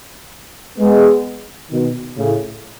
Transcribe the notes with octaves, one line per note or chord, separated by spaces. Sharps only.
G#3 B3
B2 D#3
A2 C#3